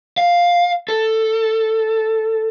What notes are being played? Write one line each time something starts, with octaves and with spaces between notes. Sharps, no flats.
F5
A4